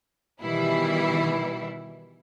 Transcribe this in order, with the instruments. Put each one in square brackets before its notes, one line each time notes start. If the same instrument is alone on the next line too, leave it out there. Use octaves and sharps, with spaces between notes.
[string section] B2 D#3 E3 G3 E4